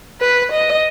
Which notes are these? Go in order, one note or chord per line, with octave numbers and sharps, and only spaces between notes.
B4
D#5